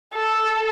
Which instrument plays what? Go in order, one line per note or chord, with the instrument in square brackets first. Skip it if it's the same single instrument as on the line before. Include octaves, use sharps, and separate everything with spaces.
[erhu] A4